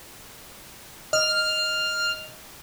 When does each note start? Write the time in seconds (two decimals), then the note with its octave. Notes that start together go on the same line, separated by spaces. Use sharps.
1.13 D#5 F6